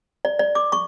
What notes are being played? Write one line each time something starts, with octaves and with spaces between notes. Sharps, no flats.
D5
D5
D6
C#6